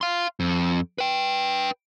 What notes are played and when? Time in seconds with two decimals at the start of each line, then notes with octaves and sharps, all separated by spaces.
0.01 F5 C6
0.40 F2
0.98 B4 G5